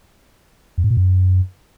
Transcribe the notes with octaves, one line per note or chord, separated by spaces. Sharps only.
F2
G#2
A#2
F#2